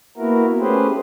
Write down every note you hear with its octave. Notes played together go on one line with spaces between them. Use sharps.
A#3 B3 E4 F#4 A#4
A3 C#4 G4 G#4 B4 C5